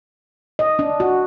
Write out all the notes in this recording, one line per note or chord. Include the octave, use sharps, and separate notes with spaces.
D#5
D4
F#4